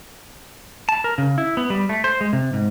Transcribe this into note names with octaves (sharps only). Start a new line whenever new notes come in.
A5
A#4
C#3
E4
B3
G3
A3
C5
G#3
C3
G#2